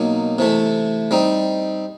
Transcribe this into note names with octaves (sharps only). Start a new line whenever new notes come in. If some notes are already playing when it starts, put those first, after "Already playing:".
Already playing: B2 F#3 A#3 D#4
C3 E3 A3
G3 C4 D#4